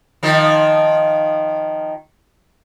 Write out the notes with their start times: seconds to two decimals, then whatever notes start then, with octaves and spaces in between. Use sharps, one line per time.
0.23 D#3 F3